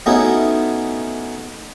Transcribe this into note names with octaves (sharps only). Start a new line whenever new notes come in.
A3 B3 C#4 D#4 E4 F#4